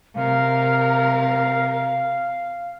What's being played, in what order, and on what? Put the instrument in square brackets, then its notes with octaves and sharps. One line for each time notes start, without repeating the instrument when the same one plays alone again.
[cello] C3 A#4 [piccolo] F5